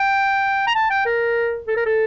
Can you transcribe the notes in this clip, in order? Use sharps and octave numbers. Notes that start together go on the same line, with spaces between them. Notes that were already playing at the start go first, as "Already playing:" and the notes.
Already playing: G5
A#5
A5
G5
A#4
A4
A#4
A4